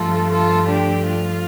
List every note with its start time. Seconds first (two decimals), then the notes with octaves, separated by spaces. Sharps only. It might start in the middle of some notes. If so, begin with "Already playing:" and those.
Already playing: G2 F3 A3 F4 A4
0.32 F4 A4
0.69 D4 G4
1.06 F4